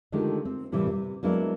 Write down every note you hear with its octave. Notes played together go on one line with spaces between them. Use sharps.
D3 D#3 F3 G#3 A3 G4
C4
A2 C3 E3 G3 A#3
C3
F#3 G#3 A#3 B3 D4 E4